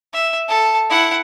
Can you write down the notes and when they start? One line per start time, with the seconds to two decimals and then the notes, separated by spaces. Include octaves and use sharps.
0.13 E5
0.48 A4 A5
0.90 E4 F#5